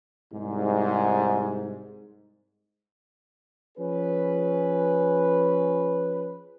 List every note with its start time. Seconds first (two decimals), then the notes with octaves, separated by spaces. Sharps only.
0.33 C2 G#2
3.78 F3 C#4 G#4 B4